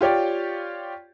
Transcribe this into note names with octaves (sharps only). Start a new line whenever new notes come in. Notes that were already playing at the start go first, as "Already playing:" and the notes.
F4 G4 C#5 D5 G5